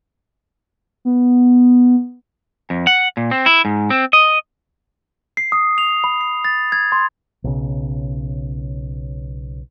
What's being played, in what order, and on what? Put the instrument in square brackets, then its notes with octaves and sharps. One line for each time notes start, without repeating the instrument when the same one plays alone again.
[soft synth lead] B3
[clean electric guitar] F2
F#5
A#2
C4
E4
G#2
C4
D#5
[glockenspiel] C7
D#6
F7
B5
C7
A6
G#6
C6
[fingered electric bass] B1 C#3